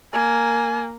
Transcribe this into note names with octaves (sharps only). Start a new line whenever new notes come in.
A#3 G#5